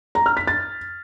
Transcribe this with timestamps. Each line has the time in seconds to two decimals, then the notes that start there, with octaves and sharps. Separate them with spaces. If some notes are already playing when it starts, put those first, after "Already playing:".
0.15 A#5
0.26 F6
0.37 B6
0.47 A6